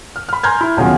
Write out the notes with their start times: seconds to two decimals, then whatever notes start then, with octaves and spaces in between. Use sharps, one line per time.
0.16 F6
0.29 B5 F6
0.43 G#5 A#5 C6 F6 G6 G#6
0.61 E4
0.77 D#1 B1 C#3 F#3 F4 G#5